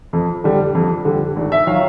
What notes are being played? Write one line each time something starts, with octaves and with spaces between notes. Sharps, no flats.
F2
D3 G3
F2
D3 G3
G#1
E5
D#3 F#3 F5